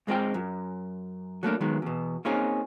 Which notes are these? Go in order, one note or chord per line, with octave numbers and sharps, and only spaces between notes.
G#2 G#3 C4 F4 G5
F#2
F#3 A3 A#3 D4
D#3 F#3 G#3 B3
E2 B2
A#3 C4 C#4 D#4 F4 G#4